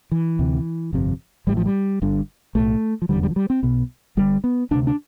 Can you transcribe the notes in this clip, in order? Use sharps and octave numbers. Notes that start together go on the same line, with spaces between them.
E3
D2 C3
G1 F2 C3
A1 A2 G3
F3
G3
G1 G2 D3
B1 A2 A3
F3
F1 E2 D3 G3
G3
F3
G3
C4
B1 B2 B3
G1 G2 D3 G3
B3
D2 C3 D4
D4